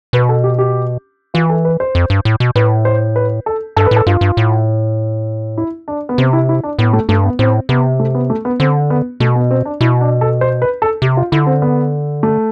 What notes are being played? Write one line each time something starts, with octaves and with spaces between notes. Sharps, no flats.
B2 B4
A4
G4
G4
E3 F4
A4
B4
C5
F2
G2
A2
B2
A2 B4
C5
B4
A4
G2 A4
A2 B4
A4
G2 F4
G2
A2
E4
D4
B3
C3 C4
E4
E4
D4
A2 B3
A3
G2 A3
B3
A2 C4
C3 B3
A3
B3
A3
B3
D3 C4
B3
B2 A3
B3
C4
D4
B2 E4
D4
A4
C5
B4
A4
C3 G4
F4
D3 E4
C4
B3
A3